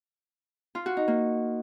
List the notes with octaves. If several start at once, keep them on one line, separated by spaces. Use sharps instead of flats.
F4
F#4
D#4
A#3